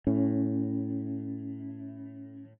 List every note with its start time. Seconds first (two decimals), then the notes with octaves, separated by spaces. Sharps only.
0.07 A2 C#4